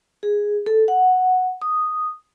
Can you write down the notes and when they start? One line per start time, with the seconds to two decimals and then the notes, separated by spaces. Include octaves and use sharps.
0.23 G#4
0.66 A4
0.88 F#5
1.62 D#6